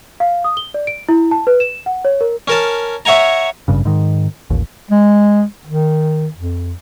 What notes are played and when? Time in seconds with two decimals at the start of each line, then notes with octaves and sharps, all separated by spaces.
0.20 F5
0.44 D#6
0.57 G7
0.74 D5
0.87 D7
1.09 E4
1.31 A5
1.47 B4
1.60 E7
1.86 F#5
2.05 C#5
2.21 A#4
2.48 C#4 A#4 A5
3.05 C#5 E5 F#5 G#5 A#5
3.68 G#1 G2 C#3
3.85 G#2 D#3
4.50 A1 D#2
4.91 G#3
5.67 D#3
6.34 F2